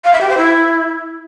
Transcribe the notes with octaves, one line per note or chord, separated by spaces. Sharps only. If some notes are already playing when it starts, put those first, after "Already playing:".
F5
E5
G4
C5
E4